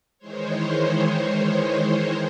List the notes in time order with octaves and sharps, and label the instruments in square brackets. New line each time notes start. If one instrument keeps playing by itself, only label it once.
[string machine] D#3 E3 G#3 C5 C#5